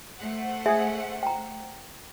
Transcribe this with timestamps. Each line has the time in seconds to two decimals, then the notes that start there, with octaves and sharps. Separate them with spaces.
0.18 A3 C5 F#5
0.66 G#4 E5
1.23 G5 A#5